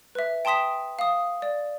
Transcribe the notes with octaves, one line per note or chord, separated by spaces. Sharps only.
B4 E5
G5 A5 C6 D#6 B6 E7
F5 D#6
D5